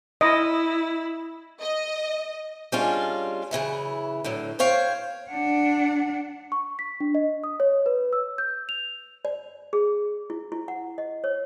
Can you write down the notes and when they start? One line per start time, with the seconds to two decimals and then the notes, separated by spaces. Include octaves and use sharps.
0.21 E4 D#5
1.61 D#5
2.72 G3 G#3 C#4 D4 F4
3.51 F#2 C#3 E3 E4
4.25 A2 D3 F#3
4.59 A2 C5 C#5 F5 G5
5.31 D4 F#5
6.52 C#6
6.79 B6
7.00 D4
7.15 D#5
7.44 D#6
7.60 C#5
7.86 B4
8.13 E6
8.38 G6
8.69 F7
9.25 D5
9.73 G#4
10.30 E4
10.52 E4
10.68 F#5
10.98 D#5
11.24 C#5